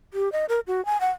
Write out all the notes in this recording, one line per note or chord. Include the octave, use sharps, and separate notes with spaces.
G4
D#5
A#4
F#4
G#5
F#5